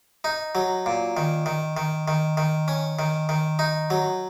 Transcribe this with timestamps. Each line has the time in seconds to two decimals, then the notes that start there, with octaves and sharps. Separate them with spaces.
0.24 D#4
0.55 F#3
0.86 A#2
1.17 D#3
1.46 D#3
1.77 D#3
2.08 D#3
2.37 D#3
2.68 C#4
2.99 D#3
3.29 D#3
3.59 D#4
3.90 F#3